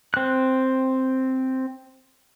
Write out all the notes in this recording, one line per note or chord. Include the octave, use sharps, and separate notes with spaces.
C4 F#6